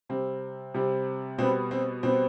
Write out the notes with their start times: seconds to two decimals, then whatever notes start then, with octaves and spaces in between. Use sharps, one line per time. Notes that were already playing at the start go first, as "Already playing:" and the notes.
0.09 C3 G3 C4
0.74 C3 G3 C4
1.38 B2 G3 B3 C4
1.71 C4
2.03 B2 G3 B3 C4